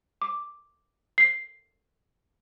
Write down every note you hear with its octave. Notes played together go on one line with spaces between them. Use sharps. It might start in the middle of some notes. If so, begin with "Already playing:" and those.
D6
C7